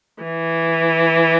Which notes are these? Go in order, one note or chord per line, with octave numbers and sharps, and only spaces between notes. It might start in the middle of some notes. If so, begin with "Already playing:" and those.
E3